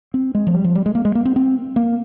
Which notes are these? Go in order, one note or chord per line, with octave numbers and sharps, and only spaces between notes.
C4
G#3
F3
G3
F3
G3
G#3
A#3
G#3
A#3
C4
C4
A#3